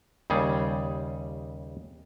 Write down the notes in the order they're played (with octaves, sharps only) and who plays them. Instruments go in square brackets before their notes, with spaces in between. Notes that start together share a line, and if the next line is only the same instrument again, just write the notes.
[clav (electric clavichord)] D#2 C#3 G3 G#4